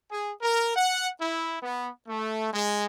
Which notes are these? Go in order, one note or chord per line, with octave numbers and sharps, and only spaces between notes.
G#4
A#4
F#5
E4
B3
A3
G#3